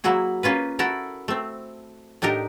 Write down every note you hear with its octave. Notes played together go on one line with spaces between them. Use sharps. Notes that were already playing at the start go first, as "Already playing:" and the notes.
F#3 A#3 E4 F#4 G#4
A#3 C#4 F4 B4
E4 F#4 A4 A#4
A3 C4
A2 D4 D#4 G4 A#4